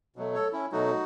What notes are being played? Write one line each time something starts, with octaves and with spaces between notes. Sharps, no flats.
B2 F#3 A3
A4 C#5
C#4 E4
B2 F#3 A3 D#4 F#4